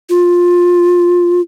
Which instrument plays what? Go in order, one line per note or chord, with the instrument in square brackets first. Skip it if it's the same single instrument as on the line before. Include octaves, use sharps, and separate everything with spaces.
[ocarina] F4